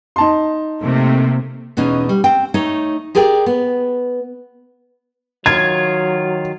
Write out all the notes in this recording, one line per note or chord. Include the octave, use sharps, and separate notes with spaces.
D#4 A5 C6
C3 A3 A#3
E2 B2 E3 C#4 D#4
G3
C4 G5
A3 D#4 C#5
G4 G#4 A#4 D5 G5
B3
D#3 F#3 F4 G#6